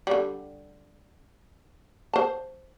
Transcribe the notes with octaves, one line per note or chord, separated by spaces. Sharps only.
D3 G3
C5 A5